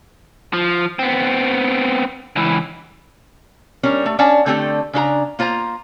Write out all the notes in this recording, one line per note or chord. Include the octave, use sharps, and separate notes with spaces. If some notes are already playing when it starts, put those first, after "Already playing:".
F3
B3 C4
C#2 E3
G3 C#4 D4 A#4
A3
C#4 D4 D5 F#5 A5
D3 A3 C4 G4 A4 D5
C#3 D4 A4 A#5
A#3 F4 C5 G#5 A#5